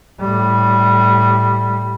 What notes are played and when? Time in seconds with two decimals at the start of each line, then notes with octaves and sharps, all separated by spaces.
0.21 A2 G3